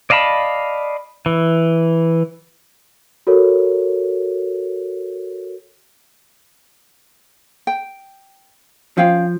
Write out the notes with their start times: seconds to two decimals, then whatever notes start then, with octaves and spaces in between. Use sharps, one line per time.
0.10 D5 D#5 F5 A5 B5
1.26 E3
3.27 F#4 A4 A#4 C#5
7.67 G5
8.97 F3 C#4 F5 G5